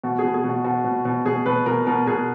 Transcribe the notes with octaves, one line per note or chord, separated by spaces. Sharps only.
B2 F#4
B2 G#4
G#4
B2
F#4
B2 F#4
B2
B2
B2 G#4
B2 B4
B2 A#4
B2 A#4
B2 G#4